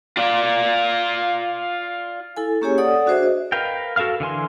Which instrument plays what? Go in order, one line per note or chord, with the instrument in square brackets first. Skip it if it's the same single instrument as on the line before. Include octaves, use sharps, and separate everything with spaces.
[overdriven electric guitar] F4 D5
[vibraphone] E4 A4 G#5
A#3 C#4 G4 G#4 C#5 G#5
A4 D5 F#5 D#6
D4 F#4 G#4 C5 E5
D#5
[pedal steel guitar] A#4 B4 F5 G5
F#4 A4 A#4 F5 F6
D3 E3 G#5 C6